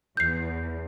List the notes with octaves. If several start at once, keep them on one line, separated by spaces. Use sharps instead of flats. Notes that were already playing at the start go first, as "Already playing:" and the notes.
E2 G6 C7